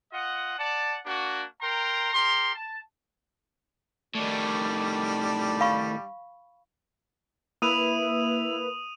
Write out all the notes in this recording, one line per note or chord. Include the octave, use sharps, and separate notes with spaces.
F4 D#5 F#5
D5 F#5 A5
A#3 D4 F#4
A#4 G5 A#5 C6
G4 A#4 C6
A5
A2 D#3 G3 D4
F5 B5 C#6
A#3 E4 B4 D#6 D#7 F7